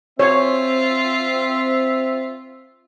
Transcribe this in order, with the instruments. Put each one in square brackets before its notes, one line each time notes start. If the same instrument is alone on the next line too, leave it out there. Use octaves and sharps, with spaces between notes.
[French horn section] C4 [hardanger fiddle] F4 [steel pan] C#5 [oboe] E5